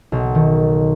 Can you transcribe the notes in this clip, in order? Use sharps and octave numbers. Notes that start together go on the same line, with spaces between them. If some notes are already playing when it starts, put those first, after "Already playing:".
B1
D#3